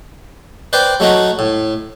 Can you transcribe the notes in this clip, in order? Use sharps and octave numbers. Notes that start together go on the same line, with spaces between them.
B4 C5 D5 G5
F#3 A3 D#4 F#4
A2